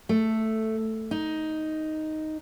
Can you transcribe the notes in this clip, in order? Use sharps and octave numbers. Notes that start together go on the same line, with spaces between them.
A3
D#4